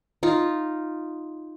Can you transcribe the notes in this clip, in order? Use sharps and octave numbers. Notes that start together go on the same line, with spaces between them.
D#4 F4